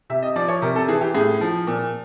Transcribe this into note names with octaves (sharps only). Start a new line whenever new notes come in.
C3 E5
D#5
F3 D5
C#5
C3 A#4
A4
E3 G#4
G4
A2 G#4
F3
A#2